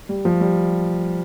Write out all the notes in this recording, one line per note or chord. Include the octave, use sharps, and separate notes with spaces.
G3
F3
G3